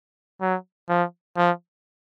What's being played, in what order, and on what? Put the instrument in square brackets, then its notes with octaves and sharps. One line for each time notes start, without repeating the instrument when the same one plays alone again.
[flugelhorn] F#3
F3
F3